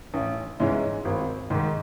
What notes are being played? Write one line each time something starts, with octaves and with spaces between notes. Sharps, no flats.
A1
G#2 E3 G#3 C#4
G#1
G#2 D#3